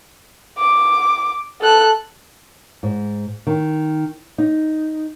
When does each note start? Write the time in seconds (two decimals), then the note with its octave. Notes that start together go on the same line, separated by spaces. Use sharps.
0.58 D6
1.61 A4 F#6
2.83 G#2
3.47 D#3
4.38 D#4